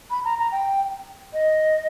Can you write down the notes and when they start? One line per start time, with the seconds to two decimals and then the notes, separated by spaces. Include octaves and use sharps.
0.10 B5
0.25 A#5
0.39 A#5
0.52 G5
1.33 D#5